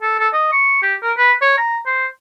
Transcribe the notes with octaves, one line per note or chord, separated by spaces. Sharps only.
A4
A4
D#5
C#6
G4
A#4
B4
C#5
A#5
C5